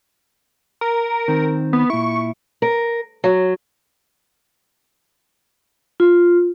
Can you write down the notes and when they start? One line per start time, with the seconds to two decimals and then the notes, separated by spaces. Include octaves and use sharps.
0.81 A#4
1.28 D#3 C4
1.73 B3
1.90 A#2 E4 C#6
2.62 A#4
3.24 F#3
6.00 F4